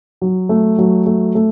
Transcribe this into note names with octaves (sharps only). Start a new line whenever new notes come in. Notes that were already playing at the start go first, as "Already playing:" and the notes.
F#3
A3
F#3
A3
A3